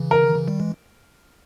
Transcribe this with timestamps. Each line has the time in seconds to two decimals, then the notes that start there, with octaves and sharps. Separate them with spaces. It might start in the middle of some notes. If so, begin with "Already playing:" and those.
Already playing: C#3 E3
0.11 A#4
0.24 D#3
0.36 C#3 E3
0.48 D#3 G3
0.60 E3 G#3